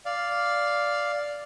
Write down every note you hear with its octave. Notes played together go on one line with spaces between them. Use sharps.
D5 F5